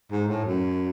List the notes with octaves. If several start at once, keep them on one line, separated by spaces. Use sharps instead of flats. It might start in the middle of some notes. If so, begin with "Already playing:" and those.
G#2
A2
F#2